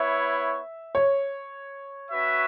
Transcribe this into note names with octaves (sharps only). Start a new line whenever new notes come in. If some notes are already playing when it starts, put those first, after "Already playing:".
Already playing: B3 E4 C#5 E5
C#5
C#4 F#4 B4 E5